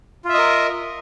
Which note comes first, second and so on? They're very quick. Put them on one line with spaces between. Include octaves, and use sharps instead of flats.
F4 E5 D#5 A#4